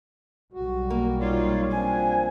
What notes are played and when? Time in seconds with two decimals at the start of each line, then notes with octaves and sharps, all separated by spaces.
0.53 B1 G3 F#4
0.90 A#3
1.21 D#4 F4 C#5 D5
1.71 F3 C4 D4 G#5